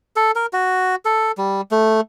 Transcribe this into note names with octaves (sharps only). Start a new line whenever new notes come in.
A4
A#4
F#4
A4
G3
A3